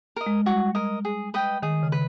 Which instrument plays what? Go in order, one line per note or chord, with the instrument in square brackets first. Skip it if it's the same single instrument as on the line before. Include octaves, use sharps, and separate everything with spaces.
[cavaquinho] A#4 D#5
[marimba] G#3
[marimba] G3 [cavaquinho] F#4
[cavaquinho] A#4 D#5
G#4
B4 D#5 G5
[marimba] D#3 [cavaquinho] G#4
[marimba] C#3
[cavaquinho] B4